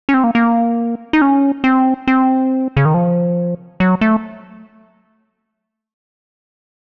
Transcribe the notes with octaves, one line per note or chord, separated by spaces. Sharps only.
C#4
C4
A#3
A#3
D#4
C#4
C4
C4
C#3
D#3
F3
F#3
A3